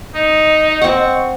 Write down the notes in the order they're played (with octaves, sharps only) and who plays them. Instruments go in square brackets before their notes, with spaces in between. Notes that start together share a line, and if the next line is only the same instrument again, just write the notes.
[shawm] D#4 [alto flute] D#5
[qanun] C4 F#5 [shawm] C#6